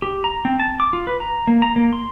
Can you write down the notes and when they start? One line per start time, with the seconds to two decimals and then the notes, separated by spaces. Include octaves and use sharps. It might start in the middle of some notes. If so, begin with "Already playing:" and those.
0.02 G4
0.24 A#5
0.45 C4
0.60 A5
0.80 D6
0.93 F4
1.07 B4
1.20 A#5
1.47 A#3
1.62 A#5
1.76 A#3
1.93 C6